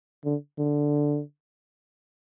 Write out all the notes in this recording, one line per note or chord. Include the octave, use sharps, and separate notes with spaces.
D3
D3